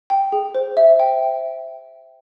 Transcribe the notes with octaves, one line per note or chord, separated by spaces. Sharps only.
G5
G#4
C5
E5
G5